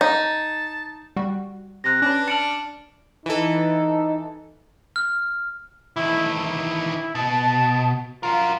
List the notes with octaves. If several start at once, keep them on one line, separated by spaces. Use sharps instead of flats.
D#4 A5
G3 F#4
C3 F#6 A#6
C#4 D4 B4
A5 F6 C#7 D7 F#7
E3 D#4 A4
F6
D#3 E3 E4
E4
B2 A5
F4 F#4 A#4